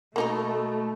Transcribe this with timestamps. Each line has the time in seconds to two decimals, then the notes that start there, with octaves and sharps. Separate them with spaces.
0.16 B2 A3 A#3 D#4 A#4